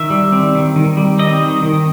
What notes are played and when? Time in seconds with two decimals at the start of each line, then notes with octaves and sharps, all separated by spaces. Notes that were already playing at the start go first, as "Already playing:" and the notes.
Already playing: D#3 E5
0.10 G3
0.32 C4
0.55 D#3
0.76 D#3
0.97 G3
1.19 C4 D#5
1.41 D#3
1.63 D#3